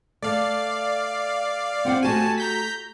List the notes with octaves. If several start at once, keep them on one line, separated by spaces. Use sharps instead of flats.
A3 D5 F5
C4 F#5 G5
A3 F#4 G4 G#5 A5
A#5 G6 B6